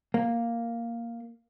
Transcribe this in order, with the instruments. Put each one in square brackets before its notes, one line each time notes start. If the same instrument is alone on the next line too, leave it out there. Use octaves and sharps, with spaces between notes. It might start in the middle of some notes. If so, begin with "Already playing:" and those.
[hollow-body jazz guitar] A#3